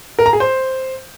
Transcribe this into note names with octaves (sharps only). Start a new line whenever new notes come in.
A#4
A#5
G#4
C5